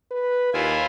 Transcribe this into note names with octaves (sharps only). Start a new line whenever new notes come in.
B4
D#2 E4 F4 G#5